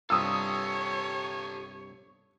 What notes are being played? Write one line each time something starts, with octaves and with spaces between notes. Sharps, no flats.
C2 G2 F4 G4 A4 C#5 D#6 E6